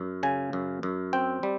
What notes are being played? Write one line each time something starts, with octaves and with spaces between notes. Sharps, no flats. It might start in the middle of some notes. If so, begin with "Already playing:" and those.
Already playing: F#2
C#3 G#5
F#2
F#2
C4 G5
G3